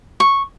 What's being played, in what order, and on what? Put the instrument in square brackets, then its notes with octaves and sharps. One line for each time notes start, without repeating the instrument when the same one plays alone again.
[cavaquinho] C#6